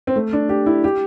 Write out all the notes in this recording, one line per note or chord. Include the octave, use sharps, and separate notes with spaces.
C4
A3
D4
G4
E4
G4